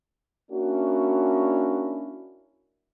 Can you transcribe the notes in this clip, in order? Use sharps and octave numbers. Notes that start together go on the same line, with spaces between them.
A#3 C#4 D4 E4 F#4